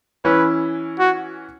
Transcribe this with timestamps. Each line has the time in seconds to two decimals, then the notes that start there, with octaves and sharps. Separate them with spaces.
0.25 E3 C#4 E4 B4
1.00 F#4